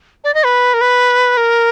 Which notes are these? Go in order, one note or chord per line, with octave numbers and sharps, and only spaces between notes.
D5
D#5
B4
A#4
B4
A#4